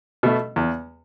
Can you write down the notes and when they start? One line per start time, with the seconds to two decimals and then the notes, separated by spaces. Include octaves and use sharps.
0.23 B2 A3
0.56 E2